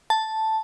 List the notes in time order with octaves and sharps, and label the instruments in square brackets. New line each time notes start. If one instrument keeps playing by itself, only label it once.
[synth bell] A5